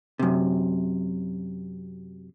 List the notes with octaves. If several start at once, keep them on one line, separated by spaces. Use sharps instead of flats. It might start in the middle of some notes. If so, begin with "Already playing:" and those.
F#2 C3